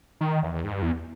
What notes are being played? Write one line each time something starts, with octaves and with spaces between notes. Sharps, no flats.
D#3
E2
G#2
G2
E2